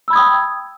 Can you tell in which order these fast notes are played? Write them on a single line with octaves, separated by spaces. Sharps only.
E6 B5 G#6 D#6 G5